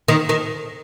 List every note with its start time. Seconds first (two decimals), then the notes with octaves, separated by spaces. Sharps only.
0.08 D#3
0.29 D#3